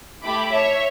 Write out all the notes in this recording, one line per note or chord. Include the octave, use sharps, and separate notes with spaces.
A3 E4 G4 B5 D6
C#5 E5